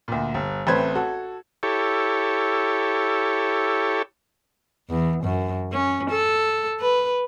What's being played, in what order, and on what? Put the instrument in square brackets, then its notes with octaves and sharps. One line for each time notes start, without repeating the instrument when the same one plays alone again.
[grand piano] D2 A#2
G1
A1 A3 C4 B4 C5 G#6
F#4 A4
[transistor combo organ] E4 G4 A4 C#5
[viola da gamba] E2
F#2
C#4
A4
B4